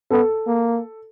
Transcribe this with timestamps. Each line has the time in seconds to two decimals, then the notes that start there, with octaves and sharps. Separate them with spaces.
0.10 B3 A4
0.47 A#3